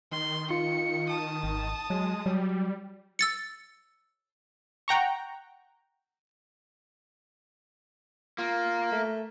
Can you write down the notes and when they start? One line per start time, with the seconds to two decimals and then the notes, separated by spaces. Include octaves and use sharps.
0.12 D#3 C6
0.50 F4 C#7
1.09 A5 D#6
1.43 G#1
1.90 F#3 G#3
2.26 F#3 G3
3.19 E6 A6 C#7
4.88 F#5 G5 A#5 C#6
8.38 A#3 F4
8.92 A3